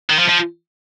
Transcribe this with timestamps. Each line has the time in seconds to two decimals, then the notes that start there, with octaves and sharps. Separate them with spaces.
0.10 D#3
0.19 F3
0.29 F3